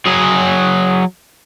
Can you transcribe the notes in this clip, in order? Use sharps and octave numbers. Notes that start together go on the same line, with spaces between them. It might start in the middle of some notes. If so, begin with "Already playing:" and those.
F#3 G#4